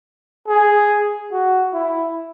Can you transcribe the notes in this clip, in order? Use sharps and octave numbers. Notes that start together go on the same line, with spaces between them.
G#4
F#4
E4